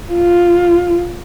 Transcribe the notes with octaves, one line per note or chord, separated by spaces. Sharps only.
F4